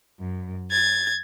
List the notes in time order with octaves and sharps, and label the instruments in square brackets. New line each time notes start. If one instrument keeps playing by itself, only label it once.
[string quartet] F#2
G#6 A6